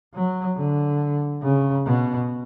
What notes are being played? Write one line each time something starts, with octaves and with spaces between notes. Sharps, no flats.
F#3
D3
C#3
B2